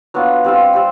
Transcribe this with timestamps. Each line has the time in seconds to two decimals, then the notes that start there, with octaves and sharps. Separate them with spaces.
0.14 F#3 B3 D4 F4
0.44 G3 C4 F4
0.73 G3 C4